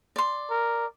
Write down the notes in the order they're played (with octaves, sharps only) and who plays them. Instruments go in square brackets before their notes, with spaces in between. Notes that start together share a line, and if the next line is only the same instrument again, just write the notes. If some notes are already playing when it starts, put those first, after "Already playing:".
[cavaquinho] D5 C6
[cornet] A#4